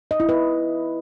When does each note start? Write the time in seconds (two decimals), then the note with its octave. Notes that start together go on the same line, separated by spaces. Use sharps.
0.11 D#5
0.20 E4
0.29 B4